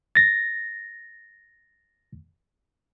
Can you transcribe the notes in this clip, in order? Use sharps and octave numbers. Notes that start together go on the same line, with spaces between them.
A6 A#6